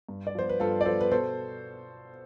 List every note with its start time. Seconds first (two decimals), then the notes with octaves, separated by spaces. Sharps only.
0.09 G2
0.27 D5
0.35 F3 B3 C5
0.49 B4
0.60 G2 F4 A4
0.81 D5
0.85 F3 B3 A4 C5
1.01 B4
1.11 B2 A4 C5